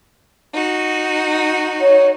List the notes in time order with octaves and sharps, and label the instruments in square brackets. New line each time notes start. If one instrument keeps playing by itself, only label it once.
[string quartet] D#4 F#4
[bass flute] C#5